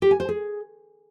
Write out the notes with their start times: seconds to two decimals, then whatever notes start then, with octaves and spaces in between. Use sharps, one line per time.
0.02 G4
0.11 G#5
0.20 C5
0.29 G#4